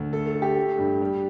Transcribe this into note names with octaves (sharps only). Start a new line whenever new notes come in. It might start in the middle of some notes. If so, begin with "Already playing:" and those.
Already playing: D2
A3 A4
A4
A3
G4
A3
G2
G3